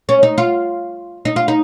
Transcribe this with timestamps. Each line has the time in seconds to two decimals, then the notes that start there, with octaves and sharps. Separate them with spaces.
0.09 C#4
0.23 D#4
0.38 F4
1.25 D#4
1.36 F4
1.48 D#4